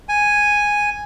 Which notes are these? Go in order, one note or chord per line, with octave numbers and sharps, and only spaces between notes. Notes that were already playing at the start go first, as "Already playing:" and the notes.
G#5